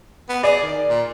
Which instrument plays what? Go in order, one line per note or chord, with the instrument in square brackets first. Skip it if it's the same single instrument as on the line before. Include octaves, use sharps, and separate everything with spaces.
[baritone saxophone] B3
[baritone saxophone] G#4 [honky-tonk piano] D5
[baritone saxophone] D#3
A#2